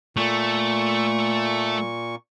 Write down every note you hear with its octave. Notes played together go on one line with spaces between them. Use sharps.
A#2 A3 C#6